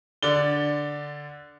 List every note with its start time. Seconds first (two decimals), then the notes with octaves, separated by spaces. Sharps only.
0.23 D3 D5 G7